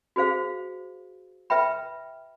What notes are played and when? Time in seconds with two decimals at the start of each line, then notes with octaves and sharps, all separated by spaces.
0.16 F#4 G#4 C5 F5
1.50 B4 E5 G5 B5